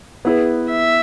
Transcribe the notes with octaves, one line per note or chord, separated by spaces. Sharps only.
B3 E4 G#4 B4
E5